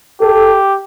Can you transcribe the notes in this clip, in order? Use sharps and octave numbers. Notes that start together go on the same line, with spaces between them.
G4 A4